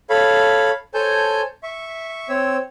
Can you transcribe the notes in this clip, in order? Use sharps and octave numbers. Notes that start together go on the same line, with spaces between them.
A4 C#5 F5 B5
A4 C5 C#5 G#5 A5 G6
E5 C#6
C4 C#5 E6